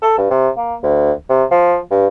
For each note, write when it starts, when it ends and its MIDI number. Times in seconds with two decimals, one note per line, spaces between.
0.02 0.16 69
0.18 0.28 43
0.31 0.49 48
0.57 0.75 58
0.83 1.12 38
1.29 1.44 48
1.51 1.78 53
1.91 2.07 43